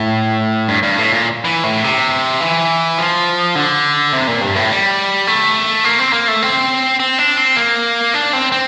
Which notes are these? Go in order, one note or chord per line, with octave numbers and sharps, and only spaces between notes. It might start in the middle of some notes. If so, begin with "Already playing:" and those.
Already playing: A2
G2
G2
A2
A#2
E3
A2
C3
E3
F3
D3
C3
A#2
G2
A2
G3
A3
A#3
C4
A#3
A3
C4
C4
D4
C4
A#3
D4
C4
C4